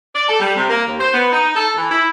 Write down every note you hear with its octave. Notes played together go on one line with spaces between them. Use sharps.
D5
A4
G3
C3
A#3
D#2
C5
B3
D#4
A4
E3
E4